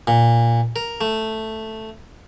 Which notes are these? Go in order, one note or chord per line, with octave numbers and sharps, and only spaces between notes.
A#2
A#4
A3